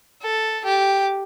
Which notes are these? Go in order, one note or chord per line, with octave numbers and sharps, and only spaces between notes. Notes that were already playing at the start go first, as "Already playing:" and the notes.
A4
G4